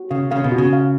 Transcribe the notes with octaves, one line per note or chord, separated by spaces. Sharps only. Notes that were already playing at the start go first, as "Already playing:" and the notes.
Already playing: F#4
C#3 F5
C#3 F5
B2
F#4
C#3
F5